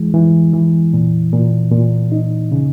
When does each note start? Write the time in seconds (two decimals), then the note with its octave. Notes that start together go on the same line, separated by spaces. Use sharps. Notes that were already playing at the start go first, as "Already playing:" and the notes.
Already playing: E3 G#3
0.14 E3
0.54 E3
0.93 A#2
1.33 A#2
1.72 A#2
2.12 D#4
2.52 C#3